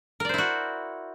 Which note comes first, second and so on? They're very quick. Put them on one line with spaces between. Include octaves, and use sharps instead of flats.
A#4 D5 C5 E4 F#4